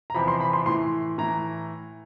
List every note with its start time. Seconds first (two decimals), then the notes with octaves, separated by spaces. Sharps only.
0.10 A#5
0.14 E2 C3 F3 B5
0.28 C6
0.40 B5
0.53 C6
0.66 A2 E3 C6
1.18 A2 E3 A#5